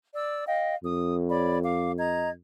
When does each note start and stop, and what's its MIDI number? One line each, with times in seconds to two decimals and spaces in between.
0.14 0.45 74
0.14 0.45 88
0.47 0.75 75
0.47 0.75 77
0.47 0.75 79
0.84 2.38 41
0.84 1.16 87
1.29 1.58 73
1.29 1.58 74
1.29 1.58 83
1.63 1.92 77
1.63 1.92 86
1.98 2.29 75
1.98 2.29 82
1.98 2.29 92